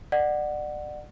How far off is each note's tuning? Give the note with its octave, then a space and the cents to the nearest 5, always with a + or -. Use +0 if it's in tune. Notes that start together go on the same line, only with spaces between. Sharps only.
D5 +30 F#5 +0